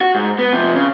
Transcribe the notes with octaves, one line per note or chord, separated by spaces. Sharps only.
F#4
G#2
B3
C3 F3
C#3